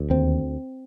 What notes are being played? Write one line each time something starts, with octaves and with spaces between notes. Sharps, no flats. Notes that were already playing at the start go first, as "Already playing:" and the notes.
Already playing: D2
D#2 C4